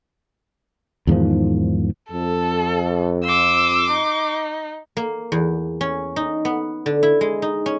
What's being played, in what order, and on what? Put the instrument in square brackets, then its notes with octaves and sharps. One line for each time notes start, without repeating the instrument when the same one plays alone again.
[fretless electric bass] E2 G#2 D#3 F3
[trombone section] F2 [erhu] A4
[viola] C6 D6 [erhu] E6
[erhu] D#4
[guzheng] A#3
E2
C#4
D#4
B3
D3
E4
G#3
D#4
C#4